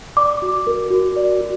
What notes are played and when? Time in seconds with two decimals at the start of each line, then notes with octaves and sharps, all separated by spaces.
0.17 D5 D6
0.42 F#4
0.67 A#4
0.91 F#4
1.16 D5
1.41 F#4